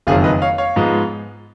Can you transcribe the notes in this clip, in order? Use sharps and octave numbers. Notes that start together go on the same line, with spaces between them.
F#1 F2 D#3 F#3 F4 G#4
B4 D#5
C#5 F5
C#5 F5
G#2 F3 G#3 B3